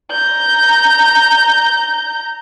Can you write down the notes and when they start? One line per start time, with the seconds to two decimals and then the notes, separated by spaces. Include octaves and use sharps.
0.12 A#5 G6